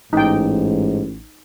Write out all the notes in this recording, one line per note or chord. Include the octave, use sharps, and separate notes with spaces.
A1 G#2 D#4 G5